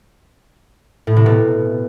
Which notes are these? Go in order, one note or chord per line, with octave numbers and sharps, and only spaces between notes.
A2
C3
B2